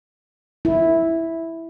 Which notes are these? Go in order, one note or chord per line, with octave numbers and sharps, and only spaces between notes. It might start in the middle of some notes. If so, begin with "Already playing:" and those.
E4